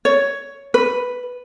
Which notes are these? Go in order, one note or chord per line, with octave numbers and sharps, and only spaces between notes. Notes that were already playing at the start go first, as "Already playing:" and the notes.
C#5
B4